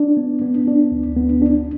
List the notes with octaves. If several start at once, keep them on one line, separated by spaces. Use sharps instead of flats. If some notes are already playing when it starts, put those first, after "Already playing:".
Already playing: D4
B3
B3
D4
D2
B3
D4